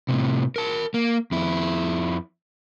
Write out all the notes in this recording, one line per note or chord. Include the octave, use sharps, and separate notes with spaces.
A2 C3
A#4 A5
A#3
F2 E4